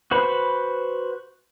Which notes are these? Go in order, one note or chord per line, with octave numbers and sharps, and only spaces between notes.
F#4 B4 C5 B5